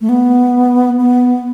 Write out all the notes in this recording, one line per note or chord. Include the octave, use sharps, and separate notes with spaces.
A3
B3
B3